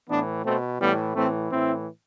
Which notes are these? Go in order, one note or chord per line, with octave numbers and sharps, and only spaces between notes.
A2 E3 B3 D4
B2 A3 C4
A2 E3 G3 B3
A2 E3 A3 C4
A2 E3 C4 E4